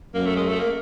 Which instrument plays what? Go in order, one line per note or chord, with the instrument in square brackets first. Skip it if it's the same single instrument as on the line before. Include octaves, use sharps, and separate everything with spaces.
[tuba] F#2 [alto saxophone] A#3
[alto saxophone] A3
G#3
A3
A#3